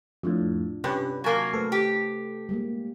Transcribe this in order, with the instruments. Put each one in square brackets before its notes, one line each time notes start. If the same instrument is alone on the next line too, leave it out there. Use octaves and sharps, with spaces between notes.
[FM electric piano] F2 A2 [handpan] D4 F4
[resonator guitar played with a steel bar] G2 [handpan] C3 [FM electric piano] C#4 G4 B4
[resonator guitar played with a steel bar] F#3 A#3 [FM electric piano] G#5 A5 G#6
[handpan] A3 B4 C5 [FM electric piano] A4
[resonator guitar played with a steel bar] G4
[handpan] G3 G#3 A#3